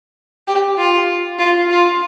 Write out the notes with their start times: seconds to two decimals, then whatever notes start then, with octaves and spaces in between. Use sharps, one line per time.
0.48 G4
0.78 F4
1.39 F4
1.70 F4